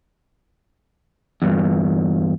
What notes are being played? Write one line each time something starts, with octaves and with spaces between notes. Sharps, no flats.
E2 G2